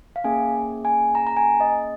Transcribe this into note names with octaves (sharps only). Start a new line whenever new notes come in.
F5
A#3 C#4 G#4 G#5
G#5
A#5
A#5
G#5
D#5